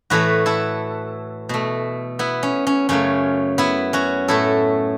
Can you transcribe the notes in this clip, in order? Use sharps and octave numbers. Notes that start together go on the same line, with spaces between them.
A2 E3 A3 F#4 B4
E4 A4
B2 A3
B3 E4
C#4
C#4
F#2 C#3 A3 C#4
B3 E4
C#4 F#4
A2 A3 E4 A4